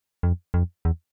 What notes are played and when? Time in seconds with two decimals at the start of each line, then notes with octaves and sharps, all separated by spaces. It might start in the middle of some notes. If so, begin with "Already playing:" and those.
0.23 F2
0.54 F2
0.85 E2